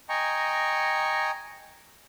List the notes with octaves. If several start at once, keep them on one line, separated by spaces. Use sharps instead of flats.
D#5 G5 G#5 A#5 C#6